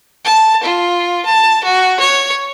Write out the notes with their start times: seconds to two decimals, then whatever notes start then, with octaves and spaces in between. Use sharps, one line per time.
0.25 A5
0.63 F4
1.26 A5
1.64 F#4
2.00 C#5